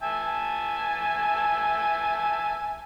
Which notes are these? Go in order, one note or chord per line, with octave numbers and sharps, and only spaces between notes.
E5 G#5 A5